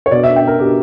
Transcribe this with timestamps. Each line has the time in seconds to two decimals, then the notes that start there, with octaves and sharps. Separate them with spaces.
0.06 C#5
0.11 B2 D5
0.24 E5
0.36 G5
0.48 A#4
0.59 B2 G4